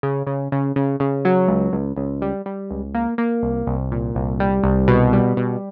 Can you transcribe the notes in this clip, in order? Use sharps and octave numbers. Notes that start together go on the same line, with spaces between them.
C#3
C#3
C#3
C#3
C#3
F#3
C#2
C#2
C#2
G3
G3
C#2
A#3
A#3
C2
C2
A#2
C2
G3
C2
B2
G3
B2